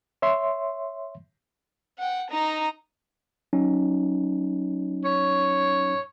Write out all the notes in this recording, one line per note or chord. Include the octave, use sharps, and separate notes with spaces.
C#5 E5 C6
F#5 G5
D#4 A#5
F#3 C#4 D#4
C#5